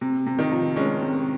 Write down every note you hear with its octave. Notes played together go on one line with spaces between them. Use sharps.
C3
C3
D#3 D#4
F3
G#3 C#4
C3